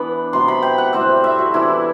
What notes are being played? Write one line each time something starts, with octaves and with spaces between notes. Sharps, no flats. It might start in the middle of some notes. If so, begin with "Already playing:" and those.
Already playing: E3 B3 D4 B5
C3 F#3 B3 C6
B5
G5
F#5
A2 G3 C4 E5
E5
F#4
E3 B3 D4 E4